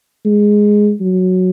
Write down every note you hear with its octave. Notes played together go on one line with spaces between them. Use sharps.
G#3
F#3